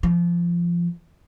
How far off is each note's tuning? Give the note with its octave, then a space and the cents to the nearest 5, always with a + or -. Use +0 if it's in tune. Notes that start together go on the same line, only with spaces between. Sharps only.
F3 -20